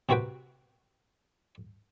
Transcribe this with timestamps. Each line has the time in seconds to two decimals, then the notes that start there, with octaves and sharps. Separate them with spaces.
0.09 C3 C4 F#4 B4 G5